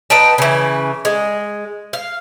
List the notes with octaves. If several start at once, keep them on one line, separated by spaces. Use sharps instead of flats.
D#4 B4 G5 A5
C#3 E3
G#3
F5